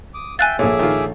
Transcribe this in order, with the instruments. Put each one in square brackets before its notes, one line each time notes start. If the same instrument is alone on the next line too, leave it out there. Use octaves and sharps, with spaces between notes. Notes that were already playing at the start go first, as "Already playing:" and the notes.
[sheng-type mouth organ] D6 D#6
[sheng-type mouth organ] E5 G5 [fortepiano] F5 [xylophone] G#5 F#6 A6
[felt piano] A#1 A4 C#5 [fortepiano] A#2 [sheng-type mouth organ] G#4 E5 D6
[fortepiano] D#3 F4